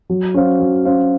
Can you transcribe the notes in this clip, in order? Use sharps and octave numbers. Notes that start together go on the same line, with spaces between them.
F#3
C#4 F#4 C5 F5
F#3
C#4 F#4 C5 F5